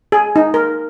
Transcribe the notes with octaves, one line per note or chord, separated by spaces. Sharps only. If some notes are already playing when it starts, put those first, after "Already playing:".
G#4
D#4
A#4